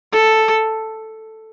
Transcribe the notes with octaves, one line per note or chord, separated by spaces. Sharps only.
A4